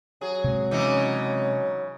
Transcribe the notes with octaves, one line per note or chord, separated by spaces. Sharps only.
F#3 G#4
C3 G#3
C#3 E3 D#4